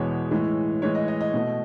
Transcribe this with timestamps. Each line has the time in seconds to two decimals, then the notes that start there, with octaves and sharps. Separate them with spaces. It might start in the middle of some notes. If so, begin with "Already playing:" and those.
Already playing: E2 B2 G#3 C#5
0.31 A2 E3 G#3
0.82 A2 E3 G#3 C#5
0.95 D#5
1.08 D#5
1.21 D#5
1.34 B2 A3